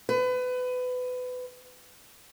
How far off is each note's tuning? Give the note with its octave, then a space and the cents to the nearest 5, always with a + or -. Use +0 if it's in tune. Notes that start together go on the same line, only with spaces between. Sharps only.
B4 +25